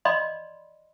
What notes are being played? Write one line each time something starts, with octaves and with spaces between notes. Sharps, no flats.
D5 D#5 B5 C6